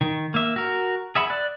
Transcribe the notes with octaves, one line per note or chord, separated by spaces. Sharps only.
D#3
A#3 E5
F#4 A#4
G#4 E5 F#5 B5
D5 F#6